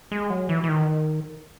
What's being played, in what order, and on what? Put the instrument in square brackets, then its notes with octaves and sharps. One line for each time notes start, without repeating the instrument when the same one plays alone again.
[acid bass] G#3
F#3
E3
E3
D#3